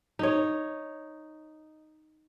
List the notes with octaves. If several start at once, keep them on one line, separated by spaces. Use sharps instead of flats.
D#4 C#5